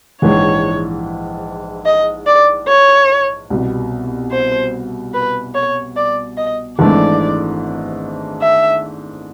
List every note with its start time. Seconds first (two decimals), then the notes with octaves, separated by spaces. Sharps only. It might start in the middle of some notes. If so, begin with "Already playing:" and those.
0.22 A#1 G#2 E3 C#5
1.86 D#5
2.27 D5
2.68 C#5
3.50 C2 B2 G3
4.32 C5
5.14 B4
5.55 C#5
5.96 D5
6.37 D#5
6.78 G#1 G#2 E3 A3 D4 D5
8.42 E5